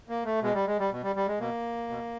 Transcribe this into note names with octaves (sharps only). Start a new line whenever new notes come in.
A#3
A3
B2 G#3
G3
G#3
G3
B2
G3
G3
G#3
B2 A#3
B2